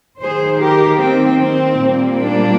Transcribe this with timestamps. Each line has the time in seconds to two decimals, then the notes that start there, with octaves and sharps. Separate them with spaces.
0.20 D#3 A#3 G#4 C5
0.59 G4 A#4
0.99 C4
1.39 C4
1.79 A#2 G3 A#3
2.19 D4